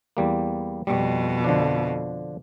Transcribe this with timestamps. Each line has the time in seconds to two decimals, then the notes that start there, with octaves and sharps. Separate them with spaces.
0.17 E2 G3 A#3
0.87 F2 B2 G3
1.44 D3 F3 D4